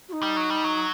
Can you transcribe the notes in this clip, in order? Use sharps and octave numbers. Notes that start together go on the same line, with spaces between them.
F#4
D#4
G3
F#3
G3
F#3